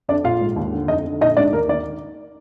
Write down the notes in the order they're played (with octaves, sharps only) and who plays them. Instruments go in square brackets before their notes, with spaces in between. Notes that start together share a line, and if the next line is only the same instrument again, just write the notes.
[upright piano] F2 D4 D5
A#1 F4 F5
G#2
D#2
D3
F2 D#4 D#5
D3
A#1 D#4 D#5
G#2 D4 D5
D#2 A#3 A#4
D#3 D5